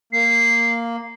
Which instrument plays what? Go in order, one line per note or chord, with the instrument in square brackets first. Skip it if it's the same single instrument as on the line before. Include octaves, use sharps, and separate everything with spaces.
[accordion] A#3 [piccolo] C7